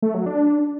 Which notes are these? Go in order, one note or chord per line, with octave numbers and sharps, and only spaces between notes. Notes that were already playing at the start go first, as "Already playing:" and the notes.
A3
F#3
D4